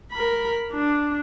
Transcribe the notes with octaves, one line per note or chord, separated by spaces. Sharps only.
A#4 B5
D4